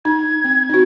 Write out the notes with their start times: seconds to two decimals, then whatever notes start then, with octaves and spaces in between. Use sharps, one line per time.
0.05 D#4 G#6
0.44 C4
0.69 D#4 F#4